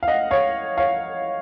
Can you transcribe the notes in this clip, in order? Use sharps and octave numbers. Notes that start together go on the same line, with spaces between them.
F5
D#5 F#5
C#5 F5
C#5 F5